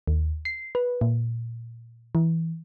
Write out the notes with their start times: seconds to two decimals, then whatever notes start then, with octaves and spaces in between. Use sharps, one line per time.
0.07 D#2
0.45 C7
0.75 B4
1.01 A#2
2.15 E3